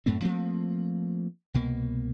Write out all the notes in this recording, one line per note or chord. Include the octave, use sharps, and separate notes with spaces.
F#2 A2 A3 C4
F3 A3 A#3 C4
C2 B2 A#3